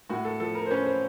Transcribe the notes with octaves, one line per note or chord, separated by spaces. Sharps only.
A2 F#4
A4
F3 A4
A#4
C5
C#4 B4
C5